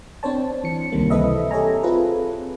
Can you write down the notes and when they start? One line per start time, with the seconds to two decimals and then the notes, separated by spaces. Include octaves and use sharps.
0.23 C4 D4 C5 C#5 A5
0.64 E3 C#7
0.92 C#2 C3 D#3 G3 A#3
1.10 E3 C4 A4 B4 D#5 E5
1.51 G4 A4 C#5 E5 G#5 A#5
1.83 C4 F4 G#4 A4 B4